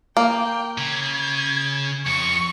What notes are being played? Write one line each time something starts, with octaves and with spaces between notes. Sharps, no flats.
A#3 G5
C#3 G#6
F2 C#6